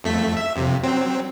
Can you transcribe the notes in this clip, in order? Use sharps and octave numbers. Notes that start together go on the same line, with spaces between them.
F2 A3 B6
E5
F2 C3
F#3 C4